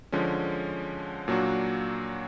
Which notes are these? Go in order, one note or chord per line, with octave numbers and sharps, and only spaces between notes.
D3 F3 G#3 C#4
A#2 F#3 A#3 D4 F#4